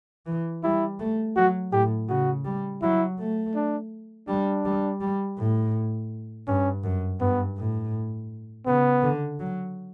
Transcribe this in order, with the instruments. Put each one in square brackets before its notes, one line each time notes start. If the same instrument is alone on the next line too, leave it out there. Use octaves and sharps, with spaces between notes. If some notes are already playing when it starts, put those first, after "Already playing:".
[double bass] E3
[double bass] G3 [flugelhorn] E4
[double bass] A3
[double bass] F#3 [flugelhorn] F#4
[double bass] A2 [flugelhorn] G4
[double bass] C#3 [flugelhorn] F#4
[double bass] G3
[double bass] F#3 [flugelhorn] E4
[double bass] A3
[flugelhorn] D4
[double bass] G3 [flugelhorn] D4
[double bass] G3
G3
A2
[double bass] G2 [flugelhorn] C#4
[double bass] F#2
[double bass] G2 [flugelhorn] B3
[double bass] A2
[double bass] C#3 [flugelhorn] B3
[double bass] D3
F#3